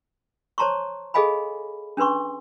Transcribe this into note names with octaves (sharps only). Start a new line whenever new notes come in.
C5 C#5 A5 A#5 C6 C#6
G#4 A4 D#5 F5 G#5 B5
C#4 D4 B4 C6 C#6